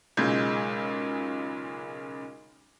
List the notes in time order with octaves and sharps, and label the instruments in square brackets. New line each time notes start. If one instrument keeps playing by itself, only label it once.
[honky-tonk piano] B1 A#2 C#3 G#3 G6 G#6